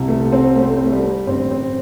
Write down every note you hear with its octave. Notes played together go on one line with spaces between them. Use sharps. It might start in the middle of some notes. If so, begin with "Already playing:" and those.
Already playing: C2 C3
A3
C4
A3
C4
A3
C4
A3
G3
A1 G2 D3 C4
C4